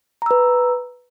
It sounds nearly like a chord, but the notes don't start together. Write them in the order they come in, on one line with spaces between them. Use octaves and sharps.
A#5 E6 B4